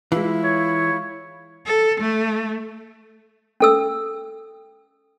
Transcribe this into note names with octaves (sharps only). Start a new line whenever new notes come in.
E3 G#3 E4 F4
C#5
A4
A3
C#4 A4 E6